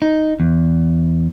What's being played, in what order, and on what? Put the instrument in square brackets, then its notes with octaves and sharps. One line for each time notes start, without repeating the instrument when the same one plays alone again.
[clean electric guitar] D#4
E2